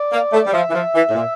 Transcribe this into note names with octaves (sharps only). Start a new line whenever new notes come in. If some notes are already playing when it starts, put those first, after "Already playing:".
Already playing: D5
A#3
A3
G3 D5
F3 E5
E3
F3
E3
A2
A#2